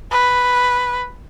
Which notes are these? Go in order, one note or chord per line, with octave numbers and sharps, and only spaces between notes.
B4